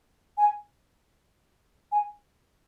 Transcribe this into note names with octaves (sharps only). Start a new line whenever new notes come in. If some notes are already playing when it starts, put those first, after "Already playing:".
G#5
G#5